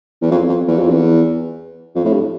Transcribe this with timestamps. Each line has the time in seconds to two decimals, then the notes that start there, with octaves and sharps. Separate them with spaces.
0.22 E2
0.31 F2
0.49 F2
0.67 E2
0.79 F2
0.90 E2
1.95 F2
2.04 A2
2.13 G2